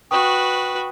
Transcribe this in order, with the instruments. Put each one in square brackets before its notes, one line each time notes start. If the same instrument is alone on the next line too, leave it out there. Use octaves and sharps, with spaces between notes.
[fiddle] F#4 B4 [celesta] G5 C#6 D#6